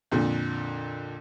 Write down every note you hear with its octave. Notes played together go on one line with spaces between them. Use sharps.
F2 A#2 D3